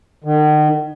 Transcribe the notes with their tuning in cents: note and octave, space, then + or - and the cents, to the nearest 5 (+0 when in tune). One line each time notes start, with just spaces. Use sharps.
D#3 -40